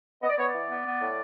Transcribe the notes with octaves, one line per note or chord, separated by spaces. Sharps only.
B3 D#5
D5
B3 C#5
D5
E3
B3
B3
A2